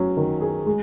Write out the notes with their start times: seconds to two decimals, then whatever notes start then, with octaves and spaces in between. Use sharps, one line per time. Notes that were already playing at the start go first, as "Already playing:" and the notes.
Already playing: F#3 C#4
0.17 D#3
0.41 G#4
0.66 G#3